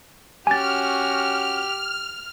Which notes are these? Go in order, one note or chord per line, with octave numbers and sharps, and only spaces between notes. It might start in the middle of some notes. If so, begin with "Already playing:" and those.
C#4 F#4 G4 G#5 F6 A6